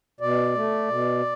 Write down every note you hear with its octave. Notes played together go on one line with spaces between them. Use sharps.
B2 D5
A3
B2